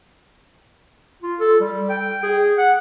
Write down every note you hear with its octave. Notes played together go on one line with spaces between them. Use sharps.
F4
A4
G3
G5
G#4
F#5